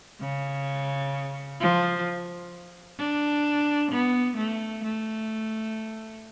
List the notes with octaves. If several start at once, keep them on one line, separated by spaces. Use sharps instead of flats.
C#3
F3
D4
B3
A3
A3